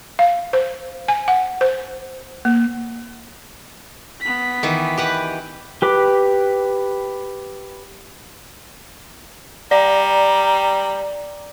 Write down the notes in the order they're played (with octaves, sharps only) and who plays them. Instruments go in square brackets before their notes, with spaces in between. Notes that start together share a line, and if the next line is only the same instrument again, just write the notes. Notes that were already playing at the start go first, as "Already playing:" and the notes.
[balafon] F5
C5
G#5
F#5
C5
A#3
[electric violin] B3 B6
[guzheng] D#3 E3
G4 B4 F#5
[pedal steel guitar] G4 B4 D6
[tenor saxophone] G3 [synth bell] D5 [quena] A#5